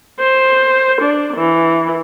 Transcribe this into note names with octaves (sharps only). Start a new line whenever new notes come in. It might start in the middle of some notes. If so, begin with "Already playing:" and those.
C5
D4
E3